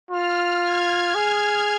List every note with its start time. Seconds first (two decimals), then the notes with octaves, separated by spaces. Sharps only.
0.11 F4 F6
0.64 G#6
1.15 G#4